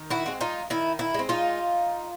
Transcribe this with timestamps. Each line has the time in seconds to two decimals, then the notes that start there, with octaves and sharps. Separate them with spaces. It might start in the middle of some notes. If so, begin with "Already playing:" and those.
Already playing: D#3
0.10 E4 F#4
0.26 G#3 C4
0.41 D#4 F4
0.70 D#3 E4
0.99 E4
1.14 G#3 C4
1.29 D#4 F4